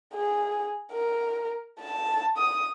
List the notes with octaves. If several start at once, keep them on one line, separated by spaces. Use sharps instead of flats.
G#4
A#4
A5
D#6